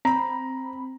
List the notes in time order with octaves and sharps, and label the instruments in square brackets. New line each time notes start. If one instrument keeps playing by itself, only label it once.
[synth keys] C4 B5 [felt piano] A#5